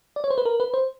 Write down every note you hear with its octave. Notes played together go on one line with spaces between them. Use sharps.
D5
C#5
C5
B4
A#4
B4
C5